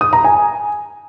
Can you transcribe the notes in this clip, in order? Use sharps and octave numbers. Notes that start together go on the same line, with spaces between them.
D#6
A#5
G#5